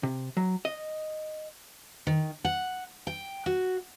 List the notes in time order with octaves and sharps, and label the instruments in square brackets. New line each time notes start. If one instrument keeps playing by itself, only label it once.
[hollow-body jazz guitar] C3
F#3
D#5
[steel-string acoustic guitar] D#3
F#5
G5
F#4